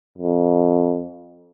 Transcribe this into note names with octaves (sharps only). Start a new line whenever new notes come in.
F2